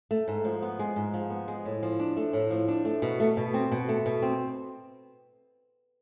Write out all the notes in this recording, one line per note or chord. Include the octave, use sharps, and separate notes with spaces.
A3
G#2
F3
B3
G#3
G#2
F3
B3
G#3
A2
F3
D4
A3
A2
F3
D4
A3
B2
A3
B2
C4
B2
A3
B2
C4